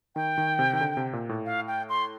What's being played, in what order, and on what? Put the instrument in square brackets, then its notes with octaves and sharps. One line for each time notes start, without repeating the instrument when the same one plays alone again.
[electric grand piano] D#3 [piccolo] G5
[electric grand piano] D#3
C3
D#3
D3
C3
A#2
A2
[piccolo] F5
G5
C6